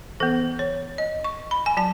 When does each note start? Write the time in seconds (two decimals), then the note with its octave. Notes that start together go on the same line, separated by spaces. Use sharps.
0.20 E3 B3 A4
0.59 C#5
0.98 D#5
1.24 C#6
1.51 B5
1.66 G#5
1.77 F#3 A5